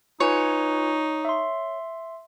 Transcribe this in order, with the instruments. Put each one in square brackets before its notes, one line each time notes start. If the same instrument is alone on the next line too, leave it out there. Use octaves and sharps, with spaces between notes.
[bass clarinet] D#4 [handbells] F4 B4 G#5 [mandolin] C#5
[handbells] E5 C6